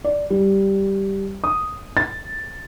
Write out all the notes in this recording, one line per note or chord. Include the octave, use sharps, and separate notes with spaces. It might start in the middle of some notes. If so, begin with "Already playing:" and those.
D5
G3
D#6
A6